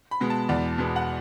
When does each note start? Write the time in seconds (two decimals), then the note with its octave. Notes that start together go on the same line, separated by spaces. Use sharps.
0.11 B5
0.20 B2 G#3 B3
0.30 A5
0.49 E2 D5
0.78 B2 G#3 B3
0.96 F#5